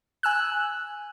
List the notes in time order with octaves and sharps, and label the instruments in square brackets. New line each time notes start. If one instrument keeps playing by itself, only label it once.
[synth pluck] G#5 E6 F#6